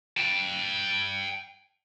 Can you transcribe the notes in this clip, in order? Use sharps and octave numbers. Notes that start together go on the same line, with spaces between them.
G5 A5